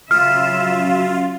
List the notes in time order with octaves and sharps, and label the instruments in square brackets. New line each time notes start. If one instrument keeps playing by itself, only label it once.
[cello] C#3 E5 [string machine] F#3 C#4 [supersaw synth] F4 [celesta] F6